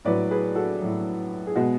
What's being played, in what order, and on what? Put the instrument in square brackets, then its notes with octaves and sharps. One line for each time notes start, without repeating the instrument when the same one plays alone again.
[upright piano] A2 F#3 B4 D5
G#4 B4
F#4 A4
A2 F#3
G#4
B2 G#3 F#4